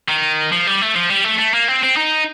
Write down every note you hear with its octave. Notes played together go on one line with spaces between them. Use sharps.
D#3
F3
G3
A3
F3
G3
A3
A3
A#3
C4
C4
D#4